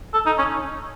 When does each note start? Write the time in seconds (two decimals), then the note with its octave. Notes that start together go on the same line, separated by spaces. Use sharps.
0.14 A4
0.26 D#4
0.38 C#4